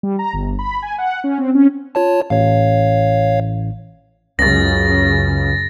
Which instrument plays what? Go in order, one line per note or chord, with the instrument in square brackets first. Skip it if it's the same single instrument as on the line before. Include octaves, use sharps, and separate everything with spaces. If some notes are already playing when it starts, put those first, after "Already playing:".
[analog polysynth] G3
A#5
G1
B5
G#5
F#5
C#4
C4
C#4
[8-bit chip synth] F4 C#5 A5
[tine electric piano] A1 [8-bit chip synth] C#5 F5
[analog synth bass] C#2 [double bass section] F#2 C#3 [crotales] A6 A#6